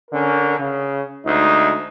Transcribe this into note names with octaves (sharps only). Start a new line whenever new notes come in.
D3 C#4 A#4
C#3
D2 G#3 D#4